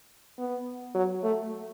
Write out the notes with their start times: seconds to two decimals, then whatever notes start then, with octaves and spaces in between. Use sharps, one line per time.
0.38 B3
0.95 F#3
1.23 A3